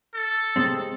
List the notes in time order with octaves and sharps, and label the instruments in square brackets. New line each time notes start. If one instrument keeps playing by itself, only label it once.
[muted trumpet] A4
[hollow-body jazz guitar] C3 G#3 C4